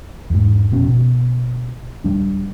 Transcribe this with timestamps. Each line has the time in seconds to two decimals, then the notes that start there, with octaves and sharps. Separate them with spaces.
0.30 E2 G#2
0.72 F1 B2 C#4
0.89 B2
2.04 D1 G3 D4